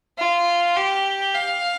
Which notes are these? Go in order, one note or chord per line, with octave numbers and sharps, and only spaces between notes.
F4
G4
F5